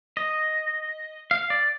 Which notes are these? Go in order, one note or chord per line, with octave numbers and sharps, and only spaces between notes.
D#5
F5
D5